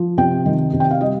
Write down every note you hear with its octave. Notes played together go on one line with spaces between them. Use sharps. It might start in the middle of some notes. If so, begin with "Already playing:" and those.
Already playing: F3
C3 G5
D#3
C3
G5
F5
G3 D#5